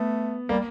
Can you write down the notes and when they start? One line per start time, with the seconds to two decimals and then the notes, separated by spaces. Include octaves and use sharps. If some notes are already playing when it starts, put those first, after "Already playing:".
Already playing: A3 B3
0.49 G3 A#3